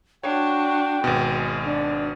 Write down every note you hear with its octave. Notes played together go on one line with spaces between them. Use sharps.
D4 F#4 C#5 G5
G#1 B2 G#3
D4